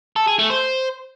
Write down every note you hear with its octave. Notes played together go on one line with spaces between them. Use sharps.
A4
G#4
A3
C5